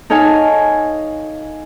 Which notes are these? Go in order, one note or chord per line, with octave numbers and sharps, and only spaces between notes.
D#4 A4 C#5 F5 G#5